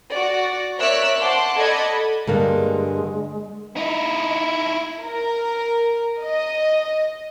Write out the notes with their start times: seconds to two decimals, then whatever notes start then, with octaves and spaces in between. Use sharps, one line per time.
0.11 F#4 D5
0.80 A#4 C#5 D5 E5 E6 F#6
1.20 C5 F#5 A5 C6 D6
1.57 A4 D5 D#5 F#5 B5 G#6
2.27 G2 D3 G#3 A#3
3.77 D#4 E4
5.02 A#4
6.23 D#5